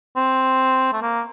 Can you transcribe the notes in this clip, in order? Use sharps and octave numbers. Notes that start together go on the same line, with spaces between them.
C4
A3
A#3